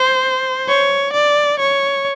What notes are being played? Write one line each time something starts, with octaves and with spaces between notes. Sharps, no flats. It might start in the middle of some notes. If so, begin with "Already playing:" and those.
Already playing: C5
C#5
D5
C#5